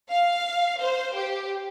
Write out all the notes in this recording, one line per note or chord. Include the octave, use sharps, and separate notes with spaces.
F5
C5
G4